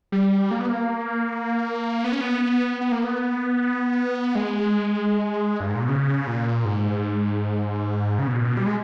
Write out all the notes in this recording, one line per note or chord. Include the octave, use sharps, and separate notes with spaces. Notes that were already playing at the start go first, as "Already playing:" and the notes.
G3
A#3
B3
A#3
B3
C#4
B3
B3
A#3
B3
G#3
G2
G#2
A#2
B2
C#3
A#2
G#2
C#3
B2
A#2
B2
G3
G#3